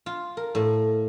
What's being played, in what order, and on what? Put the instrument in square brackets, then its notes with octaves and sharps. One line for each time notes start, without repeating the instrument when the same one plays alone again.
[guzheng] F4
A#4
A2